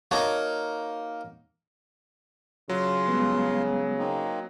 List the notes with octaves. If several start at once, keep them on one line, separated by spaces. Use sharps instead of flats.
A#3 D#4 F#4 C#5 A5
C#3 F#3 F4 C6
G3 G#3 B3
A#3 C4 D#4